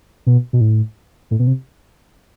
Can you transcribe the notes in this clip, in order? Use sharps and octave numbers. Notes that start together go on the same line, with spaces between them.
B2
B2
A2
A2
B2
C3